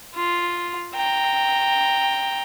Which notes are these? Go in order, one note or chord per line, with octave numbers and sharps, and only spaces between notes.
F4
G5 A#5